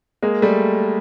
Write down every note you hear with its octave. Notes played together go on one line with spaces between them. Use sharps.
G#3 A#3
G3 A3